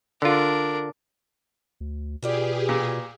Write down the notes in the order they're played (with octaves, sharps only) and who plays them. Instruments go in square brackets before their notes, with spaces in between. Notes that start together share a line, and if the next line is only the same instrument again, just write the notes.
[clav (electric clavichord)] D3 F4 [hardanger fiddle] D4 A#4
[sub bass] D2
[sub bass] B2 [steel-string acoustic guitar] B3 F4 D5 [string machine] G4 G#4
[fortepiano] A#2